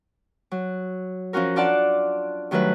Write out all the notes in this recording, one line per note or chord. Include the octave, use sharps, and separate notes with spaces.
F#3
F3 C#4 F4 F#4 A#4
D4 F4 D5 F#5 A5
G2 D#3 F#3 A3 B4